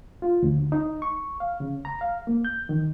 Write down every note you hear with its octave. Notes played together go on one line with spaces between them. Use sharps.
F4
D2
D3
D#4
C#6
F5
C#3
A#5
F5
A#3
G6
D#3